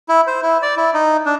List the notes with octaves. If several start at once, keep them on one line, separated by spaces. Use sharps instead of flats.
E4
C5
E4
D5
E4
D#4
D4